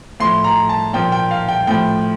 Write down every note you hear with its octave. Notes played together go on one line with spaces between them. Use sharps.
A2 F3 C6
A#5
A5
A#2 F3 G5
G5
F5
G5
A2 F3 G5